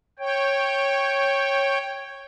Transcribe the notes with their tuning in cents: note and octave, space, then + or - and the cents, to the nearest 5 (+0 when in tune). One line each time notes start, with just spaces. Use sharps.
C#5 -10 G5 +0